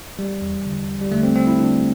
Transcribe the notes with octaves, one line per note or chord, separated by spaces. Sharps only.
G3
E2
D3
E2
G3
D3 A3
C4
D3 C4
E4
D3 D4